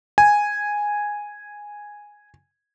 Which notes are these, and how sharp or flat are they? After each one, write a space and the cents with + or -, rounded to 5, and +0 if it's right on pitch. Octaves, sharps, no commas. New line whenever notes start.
G#5 -5